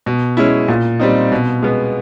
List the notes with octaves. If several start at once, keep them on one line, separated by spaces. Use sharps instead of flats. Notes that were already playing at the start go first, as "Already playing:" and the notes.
B2
G#3 C#4 E4
A#2
G3 C4 D#4
B2
G#3 B3